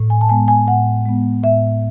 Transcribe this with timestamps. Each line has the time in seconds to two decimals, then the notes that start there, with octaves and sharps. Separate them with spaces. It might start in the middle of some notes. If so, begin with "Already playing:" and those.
Already playing: A2
0.10 G#5
0.21 A5
0.29 G#3 B3 G#5
0.48 G#5
0.67 A2 F#5
1.06 G#3 B3
1.44 A2 E5